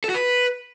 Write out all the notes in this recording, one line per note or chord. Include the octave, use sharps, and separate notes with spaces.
A4
F#4
B4